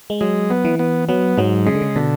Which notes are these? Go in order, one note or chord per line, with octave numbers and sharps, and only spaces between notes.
G#3
F#3 G#3
B3
E3
B3
F#3 B3
G#2 F#3
C#3 G#3
D3
C#3
B2 D3